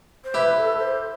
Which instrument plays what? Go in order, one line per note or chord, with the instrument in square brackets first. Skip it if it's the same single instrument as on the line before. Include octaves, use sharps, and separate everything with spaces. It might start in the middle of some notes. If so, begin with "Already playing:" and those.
[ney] C5
[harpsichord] E4 G4 [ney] B4
[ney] A4
C5